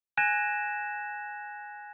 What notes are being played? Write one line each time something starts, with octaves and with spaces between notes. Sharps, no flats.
G#5 F#6 G#6 A#6 E7